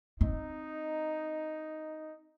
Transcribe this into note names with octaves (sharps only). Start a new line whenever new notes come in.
C4 D#4